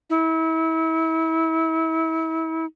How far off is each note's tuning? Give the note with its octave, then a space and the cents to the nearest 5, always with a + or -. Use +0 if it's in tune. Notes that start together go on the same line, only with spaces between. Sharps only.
E4 -35